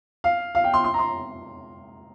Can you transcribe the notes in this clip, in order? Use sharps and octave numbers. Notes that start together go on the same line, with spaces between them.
F5
F5
G5
C6
C6
A#5
C6